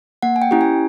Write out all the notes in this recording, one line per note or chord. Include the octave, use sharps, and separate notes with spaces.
A#3 F#5
G#5
G5
C#4 E4 G4
G#5